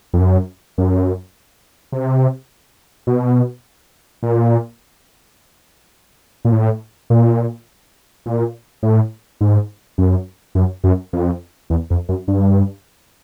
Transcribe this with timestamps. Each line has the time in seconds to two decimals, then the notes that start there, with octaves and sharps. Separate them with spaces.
0.13 F2
0.20 F#2
0.78 F#2
1.92 C3
3.07 B2
4.23 A#2
6.45 A#2
6.52 A2
7.10 A#2
8.26 A#2
8.83 A2
9.41 G#2
9.98 F#2
10.55 F#2
10.84 F#2
11.13 F2
11.70 E2
11.90 F2
12.09 F#2
12.28 G2